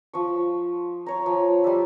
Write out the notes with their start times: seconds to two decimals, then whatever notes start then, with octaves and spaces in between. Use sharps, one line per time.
0.13 F3 C#6
1.06 C#5 A#5
1.26 F3
1.64 G3 D5 E5